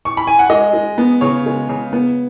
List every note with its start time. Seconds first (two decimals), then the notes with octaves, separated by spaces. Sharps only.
0.05 C#6
0.17 B5
0.27 G#5
0.39 F#5
0.50 G#3 D#5
0.73 G#3
0.98 B3
1.21 C#3 C#5
1.46 G#3
1.69 C#3
1.93 B3